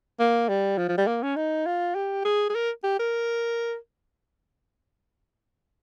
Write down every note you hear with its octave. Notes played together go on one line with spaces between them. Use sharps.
A#3
G3
F3
F3
G3
A#3
C#4
D#4
F4
G4
G#4
G#4
A#4
G4
A#4